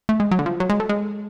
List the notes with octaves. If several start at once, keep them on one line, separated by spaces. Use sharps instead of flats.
A3
G#3
F#3
D3
F3
F#3
G#3
A3
G#3